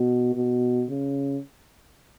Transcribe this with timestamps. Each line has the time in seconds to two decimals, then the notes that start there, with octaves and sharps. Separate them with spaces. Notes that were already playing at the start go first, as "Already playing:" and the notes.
Already playing: B2
0.35 B2
0.90 C#3